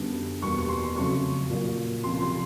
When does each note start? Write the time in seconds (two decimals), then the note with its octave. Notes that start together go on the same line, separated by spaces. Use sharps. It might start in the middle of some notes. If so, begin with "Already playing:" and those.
Already playing: F#2 D3 G3 B3
0.42 E2 B2 G3 A#3 C#6
0.58 C#6
0.69 C6
0.96 F2 C#3 F#3 A3 C#6
1.50 A#2 F#3 A#3
2.04 C#2 C3 F3 C6
2.22 C6